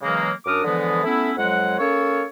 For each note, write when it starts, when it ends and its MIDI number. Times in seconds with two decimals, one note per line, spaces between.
0.02 0.30 49
0.02 0.30 52
0.02 0.30 54
0.02 0.30 56
0.02 0.30 58
0.45 0.61 42
0.45 0.61 62
0.45 0.61 70
0.45 0.61 86
0.45 0.61 87
0.45 0.61 89
0.64 1.01 50
0.64 1.01 52
0.64 1.01 53
0.64 1.01 56
0.64 1.01 59
1.04 1.32 57
1.04 1.32 59
1.04 1.32 61
1.04 1.32 64
1.37 1.78 41
1.37 1.78 54
1.37 1.78 56
1.37 1.78 78
1.78 2.24 58
1.78 2.24 61
1.78 2.24 69
1.78 2.24 73